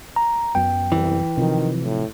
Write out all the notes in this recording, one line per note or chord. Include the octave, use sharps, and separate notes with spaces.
A#5
F#2 F#3 B3 G5
C2 E3
C3 D#3 F3 F#3
A2